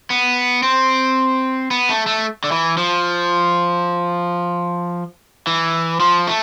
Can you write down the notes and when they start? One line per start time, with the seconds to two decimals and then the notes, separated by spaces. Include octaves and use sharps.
0.10 B3
0.63 C4
1.71 B3
1.89 A3
2.07 A3
2.44 D3
2.52 E3
2.77 F3
5.47 E3
6.00 F3
6.27 A3